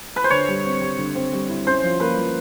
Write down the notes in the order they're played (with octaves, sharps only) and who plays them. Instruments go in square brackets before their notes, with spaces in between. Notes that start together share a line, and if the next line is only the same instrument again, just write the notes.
[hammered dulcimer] B4
C5
[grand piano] D3 [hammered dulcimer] C#5
[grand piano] G3
C4
G3
D3
C4
G3
E4
[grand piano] C#4 [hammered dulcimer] C5
[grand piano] F3
[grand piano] A#3 [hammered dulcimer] B4
[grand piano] F3